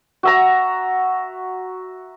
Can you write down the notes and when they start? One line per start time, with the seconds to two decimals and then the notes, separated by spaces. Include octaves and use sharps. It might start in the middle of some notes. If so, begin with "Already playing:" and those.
0.23 F#4 E5 A#5